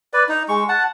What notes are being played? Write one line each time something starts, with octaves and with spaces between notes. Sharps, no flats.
B4 D5
D#4
G#3 C#6
F#5 A5